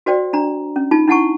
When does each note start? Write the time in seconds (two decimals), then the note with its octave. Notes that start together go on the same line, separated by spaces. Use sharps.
0.06 F#4 C5 D5 G5
0.33 D4 A#5
0.76 C#4
0.91 D#4 F4 A5
1.07 D4 E4 F#5 A5 C#6